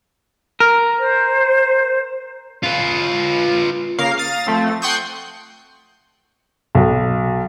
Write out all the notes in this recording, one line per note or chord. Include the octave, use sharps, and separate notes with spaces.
A#4
C5
F4 B4
C#3 A#3 A#4 F5 C7
F5 D#6 A6
F3 A3 C4
F#5 G5 C6 C#6 D#6 G6
B1